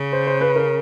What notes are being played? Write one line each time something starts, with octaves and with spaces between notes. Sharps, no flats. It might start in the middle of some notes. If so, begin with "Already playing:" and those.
Already playing: C#3
C5
C5
B4
A#4